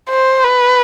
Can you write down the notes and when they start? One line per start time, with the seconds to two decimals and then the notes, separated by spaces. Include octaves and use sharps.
0.10 C5
0.44 B4